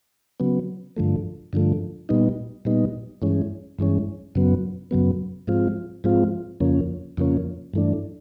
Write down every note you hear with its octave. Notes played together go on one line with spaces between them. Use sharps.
C#3 F#3 B3
G2 D3 F3 A3
G2 D3 F3 A3
A#2 G3 B3 D#4
A#2 G3 B3 D#4
G2 E3 G#3 C#4
G2 E3 G#3 C#4
F#2 C#3 F#3 B3
F#2 C#3 F#3 B3
G#2 F3 G#3 C4 F4
G#2 F3 G#3 C4 F4
F2 C#3 F3 A#3 C#4
F2 C#3 F3 A#3 C#4
G2 E3 A3 D4